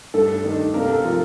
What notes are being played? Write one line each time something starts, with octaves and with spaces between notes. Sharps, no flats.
G2 A3 A4
D#3 A3 D4
C3 A#3 A#4
A3 A4
F3 A#3 F4